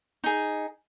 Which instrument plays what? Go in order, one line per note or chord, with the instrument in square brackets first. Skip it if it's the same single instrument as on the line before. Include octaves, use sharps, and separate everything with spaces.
[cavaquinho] D#4 G#4